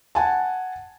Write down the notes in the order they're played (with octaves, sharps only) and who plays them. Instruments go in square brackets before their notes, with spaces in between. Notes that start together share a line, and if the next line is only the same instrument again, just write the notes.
[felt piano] F#5 G#5 A5